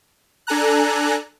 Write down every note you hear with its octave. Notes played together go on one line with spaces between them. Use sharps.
D4 A4 G#5 A#5 F#6